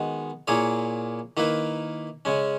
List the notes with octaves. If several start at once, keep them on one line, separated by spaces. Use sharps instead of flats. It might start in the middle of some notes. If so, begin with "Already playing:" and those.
Already playing: D#3 G#3 B3 F#4
A#2 A#3 E4 G#4 C#5
D#3 A#3 E4 B4
C#3 G#3 C#4